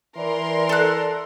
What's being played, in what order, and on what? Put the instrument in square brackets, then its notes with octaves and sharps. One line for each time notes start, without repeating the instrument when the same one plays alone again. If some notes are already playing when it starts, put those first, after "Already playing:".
[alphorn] E3 [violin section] A#4 C6 [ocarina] D5
[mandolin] A4 F#6